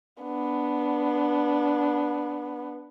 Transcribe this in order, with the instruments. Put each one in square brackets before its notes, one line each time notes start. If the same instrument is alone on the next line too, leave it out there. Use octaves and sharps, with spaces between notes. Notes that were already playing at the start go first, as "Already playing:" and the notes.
[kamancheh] B3 D4